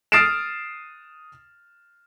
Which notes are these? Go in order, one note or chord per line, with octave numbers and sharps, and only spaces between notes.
D#6 F6 A6 C7 D7 E7